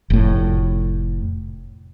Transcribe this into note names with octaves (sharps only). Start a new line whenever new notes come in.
F1 A2